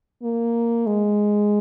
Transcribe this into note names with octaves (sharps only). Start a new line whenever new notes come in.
A#3
G#3